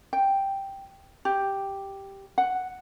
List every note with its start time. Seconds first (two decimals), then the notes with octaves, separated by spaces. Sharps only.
0.13 G5
1.25 G4
2.38 F#5